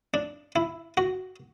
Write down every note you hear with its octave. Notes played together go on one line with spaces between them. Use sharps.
D4
E4
F#4